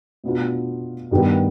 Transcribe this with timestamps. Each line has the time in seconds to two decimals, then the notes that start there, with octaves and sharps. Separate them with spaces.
0.24 B2 B3 D4 F4
1.11 G2 D#3 G3 B3